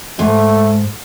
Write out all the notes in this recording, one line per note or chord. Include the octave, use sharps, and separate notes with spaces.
G#2 A3